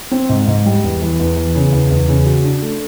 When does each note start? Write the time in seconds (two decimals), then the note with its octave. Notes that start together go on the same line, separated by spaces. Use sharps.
0.11 C4
0.29 G#2
0.47 G#2
0.66 G3
0.83 E2
1.01 E3
1.19 E2
1.36 E3
1.55 C#3
1.72 E2
1.91 E2
2.08 C#3
2.26 F#4
2.44 D4
2.62 A3